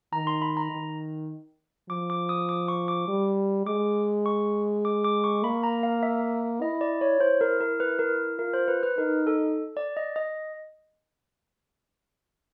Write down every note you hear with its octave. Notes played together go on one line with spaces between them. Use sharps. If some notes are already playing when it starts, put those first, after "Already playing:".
D#3 A#5
C6
B5
A#5
D#3
F3 D6
D6
D#6
D6
C#6
D6
G3
G#3 D6
C#6
D6
D6
C#6
A#3 B5
A#5
F5
E5
E4 D#5
D5
C#5
E4 C5
A#4
A#4
B4
A#4
F4 A#4
C5
B4
B4
D#4 A#4
A4
D5
D#5
D#5